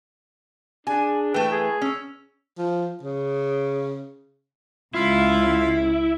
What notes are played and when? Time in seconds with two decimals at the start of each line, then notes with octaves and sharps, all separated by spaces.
0.87 D4 G#4 G#5
1.34 E3 A3 B4 G5
1.51 G#4
1.82 C#4 E6
2.58 F3
3.03 C#3
4.94 C#2 E4 F4 F5